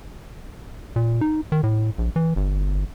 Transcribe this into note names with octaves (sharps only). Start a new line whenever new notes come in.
A#2
D#4
D#3
A2
A#1
E3
G1